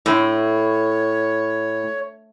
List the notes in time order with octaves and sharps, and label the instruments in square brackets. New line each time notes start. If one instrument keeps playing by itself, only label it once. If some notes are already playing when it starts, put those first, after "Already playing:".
[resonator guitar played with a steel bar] A2 [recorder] C#5